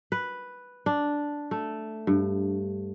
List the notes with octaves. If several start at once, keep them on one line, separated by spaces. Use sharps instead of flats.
B4
D4
A3
G2